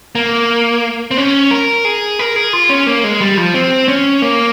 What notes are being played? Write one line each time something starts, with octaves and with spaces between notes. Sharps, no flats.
A#3
C4
C#4
A#4
G#4
A#4
G#4
F4
C#4
A#3
G#3
G3
F3
C4
C#4
A#3